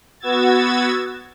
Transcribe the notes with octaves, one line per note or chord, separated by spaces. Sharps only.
B3 F#4 E6 G#6 A6